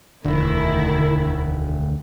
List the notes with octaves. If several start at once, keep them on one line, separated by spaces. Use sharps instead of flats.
E1 D2 D#3 E4